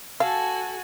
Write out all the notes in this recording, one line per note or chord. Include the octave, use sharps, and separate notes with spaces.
F#4 A4 F5 G#5